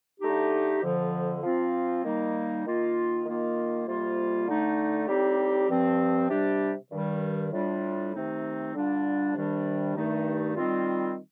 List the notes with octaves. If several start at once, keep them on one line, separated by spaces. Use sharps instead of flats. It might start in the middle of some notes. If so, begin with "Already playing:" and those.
D3 A3 D#4 G4
F2 D3 F3
F3 C4 F4
D#3 G3 A#3 D#4
D#3 A#3 F4
D#3 A#3 F4
F2 C3 G3 A#3 F4
D3 A3 D#4
A2 G3 C4 D#4 G4
G2 F3 C4
C3 G3 D4 G4
G2 D#3 G3
A2 G3 D4 F4
C3 D#3 A3 C4 D#4
D3 G3 D4 F4
C3 D#3 G3 D4
G2 D#3 A3 D#4
D#3 G3 C4 F4